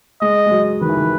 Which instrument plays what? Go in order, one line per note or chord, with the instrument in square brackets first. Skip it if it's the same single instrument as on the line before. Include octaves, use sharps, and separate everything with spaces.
[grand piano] G#3 [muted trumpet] D#5
[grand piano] G#3
F#3
[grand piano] D#3 [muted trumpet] B4
[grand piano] E3
D#3